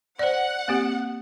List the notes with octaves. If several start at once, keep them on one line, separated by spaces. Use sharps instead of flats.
C5 D5 F#5
A#3 C4 G4